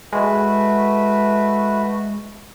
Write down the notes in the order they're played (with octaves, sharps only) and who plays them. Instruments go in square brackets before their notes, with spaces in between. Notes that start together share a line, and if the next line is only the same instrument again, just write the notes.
[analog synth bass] G#3 [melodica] A3 F#4 B4